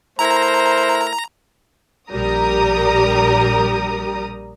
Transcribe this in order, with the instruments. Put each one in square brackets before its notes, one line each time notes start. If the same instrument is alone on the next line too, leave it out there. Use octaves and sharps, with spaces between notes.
[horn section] A3 E4 A#4 [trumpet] C5 [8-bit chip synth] A#5
[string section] A#1 G3 A#4 A#5 D#6